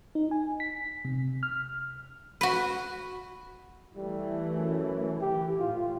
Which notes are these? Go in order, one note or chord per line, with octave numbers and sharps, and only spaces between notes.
D#4
G#5
B6
C3
F6
F#4 B4
E3 G3 A3
F#2
E3 G4
A2 F4